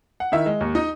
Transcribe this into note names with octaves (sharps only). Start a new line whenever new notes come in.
F#5
D#3 E4 E5
G#3
D#2
D#4 D#5